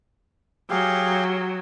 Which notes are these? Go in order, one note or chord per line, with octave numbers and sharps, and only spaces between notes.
F#3 G4 G#4 F5